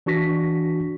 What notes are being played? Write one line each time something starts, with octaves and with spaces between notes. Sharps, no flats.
E3 D4 F#4 C#6 A#6 B6